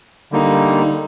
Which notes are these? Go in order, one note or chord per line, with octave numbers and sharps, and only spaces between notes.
D3 G3 A#3 D#4